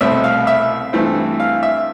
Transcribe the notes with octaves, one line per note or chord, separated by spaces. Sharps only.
C2 B2 A3 C4 E5
F5
E5
G2 E3 A3 C4
F5
E5